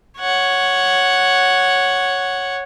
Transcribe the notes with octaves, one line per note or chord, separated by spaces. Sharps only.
C#5 F#5